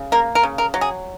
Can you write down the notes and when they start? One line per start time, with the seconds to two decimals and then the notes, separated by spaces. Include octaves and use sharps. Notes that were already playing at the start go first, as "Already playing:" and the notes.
Already playing: C#3
0.12 A#3 A#4
0.35 A#4
0.43 C#3
0.58 A#4
0.74 F#3
0.81 G#4